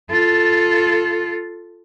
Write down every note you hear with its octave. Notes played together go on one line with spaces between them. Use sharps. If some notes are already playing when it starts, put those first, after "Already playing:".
F4 A4